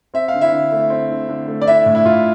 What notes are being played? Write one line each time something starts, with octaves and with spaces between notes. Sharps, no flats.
C4 E5
F5
D3
E4 E5
D3
A3
C4
D3
D3
A3
D5
D4 E4 E5
A2
E4
A2 F4